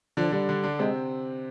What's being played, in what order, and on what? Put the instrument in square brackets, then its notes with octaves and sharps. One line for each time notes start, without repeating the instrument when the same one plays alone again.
[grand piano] D3 D4 [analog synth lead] F3
[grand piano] D3 D4 [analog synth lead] G3
[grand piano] D3 D4
D3 D4
[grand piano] C3 C4 [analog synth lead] G#3